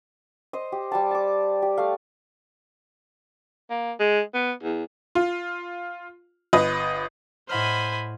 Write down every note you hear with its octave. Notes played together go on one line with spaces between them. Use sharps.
C5 D#5
G4
G3 G5 A5
A5 D6
G4
A3 F5
A#3
G#3
B3
E2
F4
G1 B4 D#5
A2 C5 D#5 F#5 G#5 B5 F6